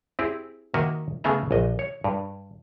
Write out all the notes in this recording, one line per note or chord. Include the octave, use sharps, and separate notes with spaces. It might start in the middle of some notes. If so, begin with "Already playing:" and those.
C4 E4 G4 G#4
D#3 A#3 F#4 D#5 E5
C#3 A3 B3 G#4 E5 A#5
A#1 D#5
C#5
G2